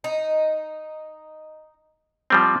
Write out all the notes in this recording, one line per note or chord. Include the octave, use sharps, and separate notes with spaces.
D#4
F3 G3 C4